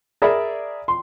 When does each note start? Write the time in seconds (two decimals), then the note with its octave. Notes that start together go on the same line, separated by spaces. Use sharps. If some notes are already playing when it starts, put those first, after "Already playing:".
0.22 G#4 A#4 D5 E5 B5
0.88 C6